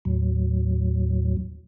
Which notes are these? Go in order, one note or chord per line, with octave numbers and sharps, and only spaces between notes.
D#2 A2 F#3